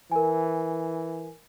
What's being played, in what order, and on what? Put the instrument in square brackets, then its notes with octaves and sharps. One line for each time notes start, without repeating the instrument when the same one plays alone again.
[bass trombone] E3 [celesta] A#4 G#5